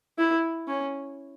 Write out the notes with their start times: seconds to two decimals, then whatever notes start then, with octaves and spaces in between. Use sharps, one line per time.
0.19 E4
0.68 C#4